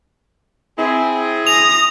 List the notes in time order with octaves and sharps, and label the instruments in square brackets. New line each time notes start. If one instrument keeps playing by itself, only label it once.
[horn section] C4 E4 G#4
[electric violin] D#6 A#6 [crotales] F7